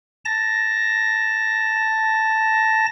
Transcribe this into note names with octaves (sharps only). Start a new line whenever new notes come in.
A5 A#6